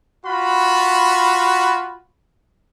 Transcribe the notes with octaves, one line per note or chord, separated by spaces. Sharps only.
F4 F#4 B5